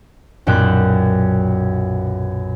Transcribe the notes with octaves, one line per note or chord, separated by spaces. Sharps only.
B1 F#2 A#2 D5 G5 F#6